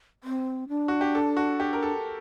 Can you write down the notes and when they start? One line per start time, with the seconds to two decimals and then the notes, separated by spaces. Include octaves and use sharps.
0.24 C4
0.69 D4
0.88 F#4
1.01 G4
1.15 A4
1.37 F#4
1.60 G4
1.73 A#4
1.83 A4